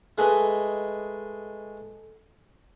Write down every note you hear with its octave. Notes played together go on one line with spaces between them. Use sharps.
G#3 A3 B4 D#5